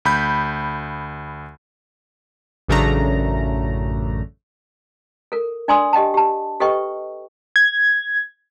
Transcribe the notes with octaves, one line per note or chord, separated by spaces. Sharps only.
D2 B5 G6
A1 F#2 C#3 A3 D4 A#5
A4 A#4
D4 D5 G#5 C6 D#6 E6
G4 D#5 G5 A5
G4 A5
G4 A4 B4 D#5 G5 C#6
G#6